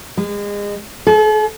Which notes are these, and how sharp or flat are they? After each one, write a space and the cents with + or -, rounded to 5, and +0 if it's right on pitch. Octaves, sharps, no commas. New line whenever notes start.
G#3 -30
A4 -45